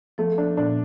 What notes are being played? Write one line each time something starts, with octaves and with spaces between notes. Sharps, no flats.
F3 A3
D4
A#2 D4